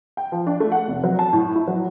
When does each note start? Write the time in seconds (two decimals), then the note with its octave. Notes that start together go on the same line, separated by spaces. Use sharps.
0.17 G5
0.32 F3
0.47 D4
0.60 A3
0.72 F#5
0.88 F1
1.04 F#3
1.19 A5
1.33 A2
1.55 E4
1.68 F#3